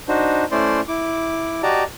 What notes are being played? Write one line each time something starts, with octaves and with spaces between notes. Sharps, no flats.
D4 D#4 F#4 C5
A3 C#4 E4 C5 D5 C6
E4 D6
F#4 G4 D5 D#5 A5 A#5